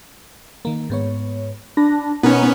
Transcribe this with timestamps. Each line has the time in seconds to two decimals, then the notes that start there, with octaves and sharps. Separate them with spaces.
0.65 D#3 A#3
0.90 G#2 B3 C#5
1.77 D4 B5 A#6
2.23 B2 B3 C#4 D#4 A#4